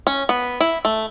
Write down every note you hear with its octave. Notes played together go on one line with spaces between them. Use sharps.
C#4
B3
E4
A3